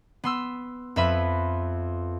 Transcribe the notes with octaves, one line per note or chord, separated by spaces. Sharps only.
B3 C6 E6
F2 B4 E5 B5